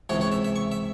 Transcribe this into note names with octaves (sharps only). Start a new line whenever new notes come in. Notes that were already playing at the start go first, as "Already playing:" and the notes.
C#2 C3 E3 C#5
C#5
E5
E5
C#6
E5